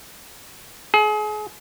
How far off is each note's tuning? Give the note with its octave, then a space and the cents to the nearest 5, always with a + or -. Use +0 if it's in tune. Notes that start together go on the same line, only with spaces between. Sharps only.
G#4 +35